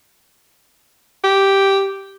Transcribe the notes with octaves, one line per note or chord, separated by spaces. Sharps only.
G4